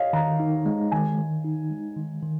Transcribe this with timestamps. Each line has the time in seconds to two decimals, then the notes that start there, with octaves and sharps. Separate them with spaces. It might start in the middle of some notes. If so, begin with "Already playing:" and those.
Already playing: C#5 D#5 F5
0.13 D#3 A#5
0.40 D#4
0.66 G#3
0.92 D#3 G#5
1.18 D#3
1.44 D#4
1.70 G#3
1.97 D#3
2.23 D#3